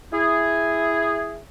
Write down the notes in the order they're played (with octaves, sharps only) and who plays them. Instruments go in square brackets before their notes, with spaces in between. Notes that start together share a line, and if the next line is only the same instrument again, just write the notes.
[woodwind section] E4 G#4